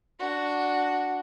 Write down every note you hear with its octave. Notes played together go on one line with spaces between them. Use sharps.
D4 F#4